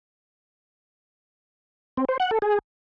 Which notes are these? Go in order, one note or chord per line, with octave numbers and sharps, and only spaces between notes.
C4
C5
F#5
A4
G#4